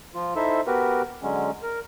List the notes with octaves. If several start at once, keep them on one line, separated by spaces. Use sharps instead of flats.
F3 F4
D#4 E4 A4 C5 E5
B3 F#4 G4 A#4 B4
D3 F#3 G#3 C#4
A#4